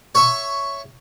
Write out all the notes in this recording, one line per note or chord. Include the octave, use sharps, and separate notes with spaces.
C#5 E5 C#6